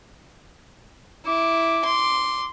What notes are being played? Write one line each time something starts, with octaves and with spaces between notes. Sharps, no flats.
E4 D6
C6